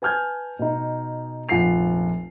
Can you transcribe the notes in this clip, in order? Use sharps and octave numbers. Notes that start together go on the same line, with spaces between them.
B4 G#5 A5 F6 G6 G#6
B2 D#4
F1 A#1 F4 F#5 C7 F7